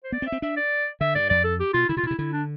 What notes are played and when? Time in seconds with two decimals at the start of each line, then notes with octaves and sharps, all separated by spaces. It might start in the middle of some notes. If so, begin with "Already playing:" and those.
0.04 C5
0.12 B3 D5
0.22 C4
0.27 E5
0.32 C4
0.42 D4 E5
0.57 D5
1.01 D3 E5
1.15 G2 D5
1.30 F2 D5
1.44 A4
1.60 G4
1.74 B2 F4
1.89 D3 E4
1.97 C3 F4
2.03 B2
2.07 E4
2.11 C3
2.19 D3 E4
2.32 D4